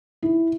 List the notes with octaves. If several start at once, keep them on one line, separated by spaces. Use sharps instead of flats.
E4